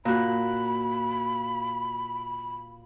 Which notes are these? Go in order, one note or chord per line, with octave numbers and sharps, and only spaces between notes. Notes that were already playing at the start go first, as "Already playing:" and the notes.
A#2 F#4 B5